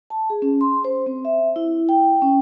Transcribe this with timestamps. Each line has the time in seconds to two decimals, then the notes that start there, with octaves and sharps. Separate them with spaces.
0.10 A5
0.30 G#4
0.42 C#4
0.61 C6
0.84 C5
1.06 C4
1.25 E5
1.56 E4
1.89 G5
2.22 C#4